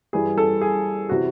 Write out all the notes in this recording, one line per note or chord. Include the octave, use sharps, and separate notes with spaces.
G2 E3 G3 G#4
A4
G#4
C3 E3 F#4